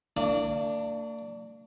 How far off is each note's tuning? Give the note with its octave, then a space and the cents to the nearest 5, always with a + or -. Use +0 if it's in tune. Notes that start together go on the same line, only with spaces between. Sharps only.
A#3 -45 D4 +0 D6 +0